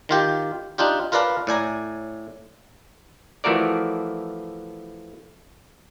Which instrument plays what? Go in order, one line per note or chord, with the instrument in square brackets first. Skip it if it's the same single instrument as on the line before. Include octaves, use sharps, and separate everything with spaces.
[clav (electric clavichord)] D#3 F4 G4
D4 D#4 F4 G4
F4 A#4 B4 D5 F5 A5
A2 D5 G#5 A#5
E3 F3 A3 F#4 A#4 D5